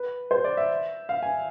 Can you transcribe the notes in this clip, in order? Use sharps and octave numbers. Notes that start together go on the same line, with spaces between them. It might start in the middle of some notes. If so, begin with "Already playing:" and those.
Already playing: B4
C5
D5
E5
F5
G#5